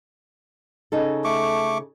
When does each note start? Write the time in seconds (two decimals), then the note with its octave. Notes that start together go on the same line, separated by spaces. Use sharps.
0.92 C#3 D#4 A4
1.24 A3 C#6 D6